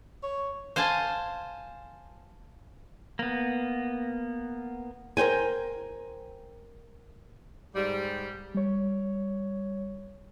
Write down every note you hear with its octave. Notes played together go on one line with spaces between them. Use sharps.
C#5
C5 F5 G#5 A5
A#3 B3
A#4 C5 G5 G#5
G#2 G3
G3 C#5